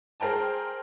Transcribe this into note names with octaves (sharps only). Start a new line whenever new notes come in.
G#4 A#4 C5 G5 A5